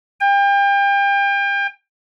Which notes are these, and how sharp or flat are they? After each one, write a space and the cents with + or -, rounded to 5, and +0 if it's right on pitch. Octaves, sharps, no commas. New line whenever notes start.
G5 +35